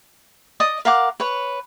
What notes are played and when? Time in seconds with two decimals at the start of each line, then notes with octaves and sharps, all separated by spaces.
0.60 D5 D#5 D#6
0.85 A#4 F5 F#5 D6
1.20 B4 C#5